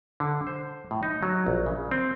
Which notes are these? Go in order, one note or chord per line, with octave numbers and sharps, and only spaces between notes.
D3
C5
A2
D#4
F#3
A#1
C#3
C4